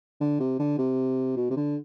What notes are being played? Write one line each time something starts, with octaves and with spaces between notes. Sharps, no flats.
D3
C3
D3
C3
B2
C3
D3